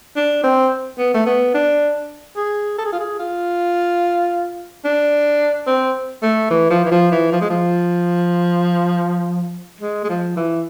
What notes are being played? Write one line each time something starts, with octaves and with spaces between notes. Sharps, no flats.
D4
C4
B3
A3
B3
D4
G#4
A4
G#4
F4
G#4
F4
D4
C4
A3
E3
F3
E3
F3
E3
F3
G#3
F3
G#3
G#3
F3
E3